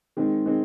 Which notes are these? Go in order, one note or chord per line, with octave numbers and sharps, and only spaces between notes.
D#3 G#3 C4
D#3 G#3 C4